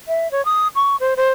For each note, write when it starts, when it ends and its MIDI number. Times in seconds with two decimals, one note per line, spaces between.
0.08 0.30 76
0.31 0.44 73
0.45 0.68 87
0.75 0.96 85
1.00 1.14 72
1.17 1.32 72